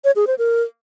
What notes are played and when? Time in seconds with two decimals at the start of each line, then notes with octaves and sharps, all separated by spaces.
0.04 C#5
0.16 G#4
0.27 C5
0.38 A#4